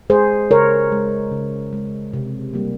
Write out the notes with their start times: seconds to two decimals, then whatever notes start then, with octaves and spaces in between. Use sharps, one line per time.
0.10 G#3 G#4 C5
0.51 C#3 A#4 C#5
0.92 G#3
1.32 C#3
1.73 G#3
2.13 C3
2.54 G3 A#3